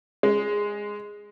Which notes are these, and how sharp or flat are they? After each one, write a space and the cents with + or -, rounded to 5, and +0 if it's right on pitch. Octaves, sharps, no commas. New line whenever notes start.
G#3 -10